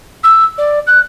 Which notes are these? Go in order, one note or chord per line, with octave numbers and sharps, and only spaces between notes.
E6
D5
F#6